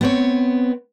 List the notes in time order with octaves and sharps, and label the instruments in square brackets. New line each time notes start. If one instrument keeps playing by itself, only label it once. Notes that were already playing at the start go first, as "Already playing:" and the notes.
[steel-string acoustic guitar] B3 C4 C#5